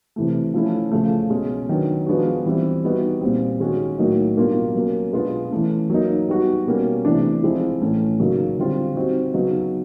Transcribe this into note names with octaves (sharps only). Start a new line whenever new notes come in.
C3 E3 A3
F3 A3 C#4 E4
C#3 F3 A3
B2 G#3 C#4
D#3 F#3 B3 D4
F3 G#3 B3 D4 F#4
E3 G3 C4 E4
G3 B3 D#4 F#4
A#2 G3 C4
D#3 G#3 C#4 F#4
A2 F#3 A#3 D#4 F#4
B2 G3 A#3 D4 F4
F#3 A#3 C#4
B2 G#3 B3 D4 F4
E3 A3 C#4
F#3 A#3 D#4
G3 B3 D#4 F#4
B2 G3 A#3 C#4 F#4
C3 E3 A3 D4
F3 G#3 C4 E4
A2 E3 A3 C#4
C#3 F#3 A#3 D#4 F#4
D3 G3 C4 F4
G3 C4 D#4 F#4
C#3 F#3 B3 D#4 F#4